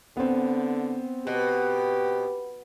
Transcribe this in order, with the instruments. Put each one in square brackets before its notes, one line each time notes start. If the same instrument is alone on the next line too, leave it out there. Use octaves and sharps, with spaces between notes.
[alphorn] D3 [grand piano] B3 C4
[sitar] B2 [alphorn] G4